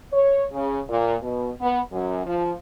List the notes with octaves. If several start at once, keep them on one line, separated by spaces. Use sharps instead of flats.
C#5
C#3
A#2
B2
B3
F#2
F3